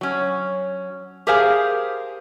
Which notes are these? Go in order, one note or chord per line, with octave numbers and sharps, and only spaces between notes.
F#3 C#4
G4 G#4 A#4 C5 F5 G#5